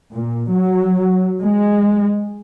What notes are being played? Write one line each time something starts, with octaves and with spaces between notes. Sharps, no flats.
A#2
F#3
G#3